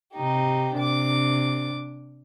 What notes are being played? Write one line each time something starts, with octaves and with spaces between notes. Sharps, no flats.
C3 D#4 G4
C3 D4 D6